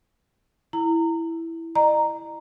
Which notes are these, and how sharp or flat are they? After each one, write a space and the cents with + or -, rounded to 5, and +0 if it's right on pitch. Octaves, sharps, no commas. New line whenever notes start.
E4 +0 A#5 -25
D#5 -45 A#5 +0